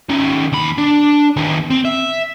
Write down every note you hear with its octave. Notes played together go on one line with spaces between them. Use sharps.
D#3 C#4
D#2 B5
D4
D#3 B3
C4
E5